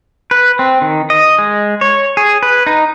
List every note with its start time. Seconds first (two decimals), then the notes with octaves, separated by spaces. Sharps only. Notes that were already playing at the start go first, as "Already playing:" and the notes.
0.31 B4
0.59 C4
0.82 D#3
1.10 D#5
1.39 G#3
1.81 C#5
2.17 G#4
2.43 B4
2.67 D#4